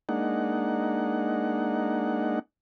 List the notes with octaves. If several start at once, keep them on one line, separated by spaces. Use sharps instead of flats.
G#3 A#3 D4 D#4 F#5